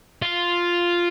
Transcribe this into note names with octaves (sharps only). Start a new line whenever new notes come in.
F4